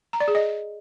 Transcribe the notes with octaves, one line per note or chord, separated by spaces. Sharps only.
A#5
D5
G#4
D#5